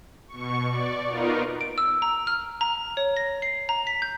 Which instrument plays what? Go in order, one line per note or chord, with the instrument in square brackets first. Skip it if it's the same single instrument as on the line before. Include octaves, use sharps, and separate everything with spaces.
[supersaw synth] B2 C#6
D5
B3 D#4 F4 A#4
[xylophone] D7
E6
A#5
F6
A#5
C#5
A#6
C7
A#5
B6
G6